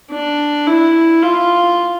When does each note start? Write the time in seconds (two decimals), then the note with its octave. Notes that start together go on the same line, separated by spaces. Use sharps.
0.11 D4
0.67 E4
1.23 F4